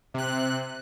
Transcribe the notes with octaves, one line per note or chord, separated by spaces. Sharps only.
C3 F#6